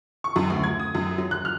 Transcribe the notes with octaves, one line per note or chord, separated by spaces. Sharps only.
C#6
F#2
D2
G#6
D#6
F#2
F#3
F#6
F6